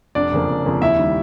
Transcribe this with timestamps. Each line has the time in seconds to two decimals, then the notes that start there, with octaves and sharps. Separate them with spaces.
0.15 F1 D4 D5
0.32 F2 C#3 F3 A#3
0.48 F1
0.66 F2 C#3 F3 A#3
0.82 D#2 E4 E5
0.98 D#3 G3